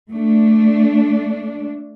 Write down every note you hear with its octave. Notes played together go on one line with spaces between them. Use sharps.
A3 D4